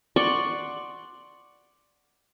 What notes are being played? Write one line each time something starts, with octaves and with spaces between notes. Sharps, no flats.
D5 F#5 C6 C#6